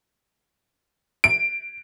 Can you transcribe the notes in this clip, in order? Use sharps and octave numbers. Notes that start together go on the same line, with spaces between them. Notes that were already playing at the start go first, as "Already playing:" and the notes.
D7